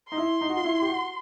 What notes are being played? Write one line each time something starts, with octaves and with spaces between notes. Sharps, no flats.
D#4 C6
E4
D#4
F#4
F4
E4
G4
F#4